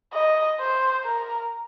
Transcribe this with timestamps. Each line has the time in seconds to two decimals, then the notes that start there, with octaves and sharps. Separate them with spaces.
0.14 D#5
0.60 C5
1.04 A#4